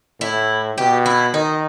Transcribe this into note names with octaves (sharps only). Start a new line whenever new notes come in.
A2 E4
B2 G4
E4
D#3 D#4